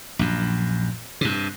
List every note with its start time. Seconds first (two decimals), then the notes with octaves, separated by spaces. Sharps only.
0.19 A#1 F#2
1.21 G2 C3